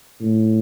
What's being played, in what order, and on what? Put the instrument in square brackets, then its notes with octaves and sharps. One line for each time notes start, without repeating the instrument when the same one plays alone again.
[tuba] A2